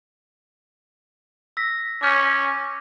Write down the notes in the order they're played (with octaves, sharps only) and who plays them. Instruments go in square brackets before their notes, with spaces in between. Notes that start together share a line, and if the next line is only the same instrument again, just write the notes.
[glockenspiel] E6 A#6 B6
[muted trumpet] C#4 [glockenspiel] D6 F6 G6